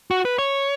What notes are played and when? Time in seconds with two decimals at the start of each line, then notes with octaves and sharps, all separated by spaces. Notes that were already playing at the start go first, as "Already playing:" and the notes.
0.11 F#4
0.25 B4
0.38 C#5